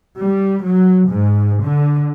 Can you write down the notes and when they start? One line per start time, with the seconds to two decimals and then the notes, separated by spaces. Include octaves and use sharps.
0.19 G3
0.65 F#3
1.09 G#2
1.64 D3